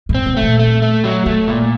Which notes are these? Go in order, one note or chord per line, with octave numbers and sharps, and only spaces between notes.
A2
C4
B2
A3
A#2
A3
A3
F#3
B2 A3
A#2